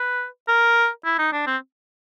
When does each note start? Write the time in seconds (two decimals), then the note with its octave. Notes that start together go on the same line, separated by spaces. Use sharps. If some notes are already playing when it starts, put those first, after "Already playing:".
Already playing: B4
0.48 A#4
1.05 E4
1.19 D#4
1.33 D4
1.47 C4